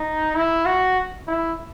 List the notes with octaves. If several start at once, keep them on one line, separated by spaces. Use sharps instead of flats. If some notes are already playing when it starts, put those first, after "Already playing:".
Already playing: D#4
E4
F#4
E4